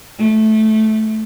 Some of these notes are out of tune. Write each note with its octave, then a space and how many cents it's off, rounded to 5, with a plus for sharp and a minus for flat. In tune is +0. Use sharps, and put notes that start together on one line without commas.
A3 -10